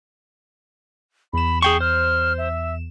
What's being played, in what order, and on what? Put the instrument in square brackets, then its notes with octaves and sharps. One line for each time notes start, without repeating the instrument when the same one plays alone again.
[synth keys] E2 E7 [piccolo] B5
[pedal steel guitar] G#4 G5 C#6 [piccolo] C7
[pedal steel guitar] C5 [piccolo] F6
[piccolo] E5